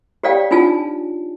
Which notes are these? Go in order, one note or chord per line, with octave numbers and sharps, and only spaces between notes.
G4 C#5 D5 F5 G5
D4 D#4 F4 G#5 A5